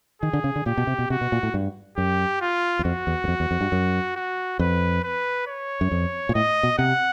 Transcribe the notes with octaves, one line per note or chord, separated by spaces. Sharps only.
D#3 G#4
D3
C#3
D3
A#2 G4
B2
C3
B2
C3 F#4
B2
A#2
A2
G2
F#2 G4
F4
E2
F2 F#4
E2
F#2
F2
E2
F2
G2
F#2
F#4
F2 B4
B4
C#5
F#2
F2
A#2
A2 D#5
B2
C3 F#5